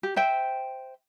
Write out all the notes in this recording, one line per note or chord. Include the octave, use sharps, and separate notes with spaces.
G4
C5 E5 G5